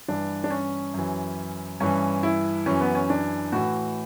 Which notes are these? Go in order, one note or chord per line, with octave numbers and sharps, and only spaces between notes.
G2 E3 D4
D4
C#4
F#2 E3
G2 E3 C#4
E4
F#2 E3 C#4
B3
C#4
D4
A2 E3 F#4